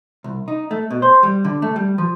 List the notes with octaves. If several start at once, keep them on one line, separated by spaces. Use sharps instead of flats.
C2
D#4
A3
B2
C5
G3
D3
A3
G3
F3